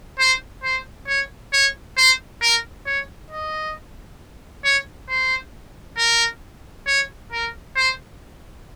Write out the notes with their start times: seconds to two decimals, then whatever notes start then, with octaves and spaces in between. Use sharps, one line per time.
0.19 C5
0.64 C5
1.08 C#5
1.53 C#5
1.98 C5
2.42 A#4
2.86 C#5
3.31 D#5
4.64 C#5
5.09 C5
5.98 A#4
6.87 C#5
7.32 A#4
7.76 C5